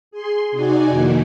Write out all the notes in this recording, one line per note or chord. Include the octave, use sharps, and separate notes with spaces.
G#4 C6
C3 D#4 F#4 D5 G#5
F2 D#3 A#3 D#4 E4